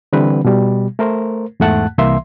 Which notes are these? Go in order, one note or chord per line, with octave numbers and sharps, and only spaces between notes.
D3 E3 G3 C4 B4
B2 G3
A3 A#4 C5
E2 G#2 A3 F#5 A5 F#6
C2 E3 A#3 E5 C6